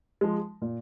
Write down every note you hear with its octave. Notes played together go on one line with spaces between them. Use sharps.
F3 G#3
A#2